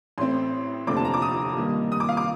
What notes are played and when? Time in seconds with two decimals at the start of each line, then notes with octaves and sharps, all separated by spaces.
0.18 A1 A2 A3 C4 C6
0.87 F1 D#2 D3 A3 C4 D6
0.97 A5
1.05 A#5
1.14 D6
1.22 D#6
1.57 G2 D#3 A#3
1.92 D#6
2.00 D6
2.09 F5
2.17 D6